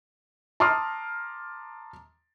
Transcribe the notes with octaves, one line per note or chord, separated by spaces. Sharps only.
A5 A#5 C6 D6 D#6 F6